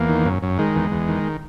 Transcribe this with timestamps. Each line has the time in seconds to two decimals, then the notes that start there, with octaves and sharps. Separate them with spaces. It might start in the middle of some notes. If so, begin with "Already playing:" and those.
Already playing: E2 A#3
0.09 D#3
0.25 F#2
0.43 F#2
0.59 D#3 G#3
0.75 E2
0.92 E2
1.08 D#3